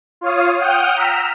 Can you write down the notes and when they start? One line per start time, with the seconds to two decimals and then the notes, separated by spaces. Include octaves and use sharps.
0.21 F4 C#5 F5 D#6
0.59 F#5 G5 D#6 F6 G6
0.96 A#5 E6 F6 B6